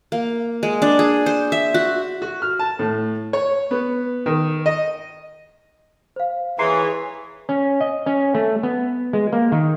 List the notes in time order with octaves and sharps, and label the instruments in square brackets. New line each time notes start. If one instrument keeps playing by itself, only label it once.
[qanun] A#3
G#3
D4
G#4
C5
E5
F#4
[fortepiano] F#4
F6
A5
A2
C#5
B3
D#3
D#5
[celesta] C5 F5
[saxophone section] E3 [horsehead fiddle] G#4 C#5 [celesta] A#5 C6 C7
[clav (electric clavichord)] C#4
D#5
C#4
A3
B3
G#3
A#3
D#3